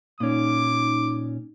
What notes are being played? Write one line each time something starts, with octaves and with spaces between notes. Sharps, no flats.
A#2 C#4 D#4 D6